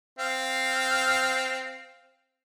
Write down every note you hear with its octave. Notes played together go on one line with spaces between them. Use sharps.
C4 F5